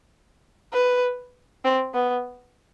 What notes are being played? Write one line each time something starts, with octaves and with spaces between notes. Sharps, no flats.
B4
C4
B3